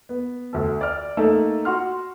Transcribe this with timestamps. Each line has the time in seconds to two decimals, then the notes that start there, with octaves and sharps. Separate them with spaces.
0.09 B3
0.53 D2 A4
0.81 D5 F6
1.17 A3 A#3 D#4 A4
1.65 F#4 F#5 C6 F6